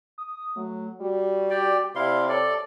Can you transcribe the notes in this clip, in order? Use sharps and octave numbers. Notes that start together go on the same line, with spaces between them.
D#6
F#3 A3
G3 F#4
G4 D5 G5
C3 E4 D5 F5 C6
A4 C#5 D5